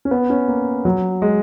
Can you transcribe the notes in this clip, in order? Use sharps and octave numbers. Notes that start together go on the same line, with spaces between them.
C#4
B3
C#4
A#3
F#3
G#3